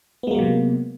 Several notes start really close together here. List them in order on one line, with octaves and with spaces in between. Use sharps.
B3 G#3 A#3 F#3 C3